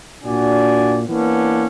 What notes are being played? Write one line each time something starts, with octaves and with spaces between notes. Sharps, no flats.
A#2 D4 F#4 D5 G#5
E3 A#3 B3 C#4 D4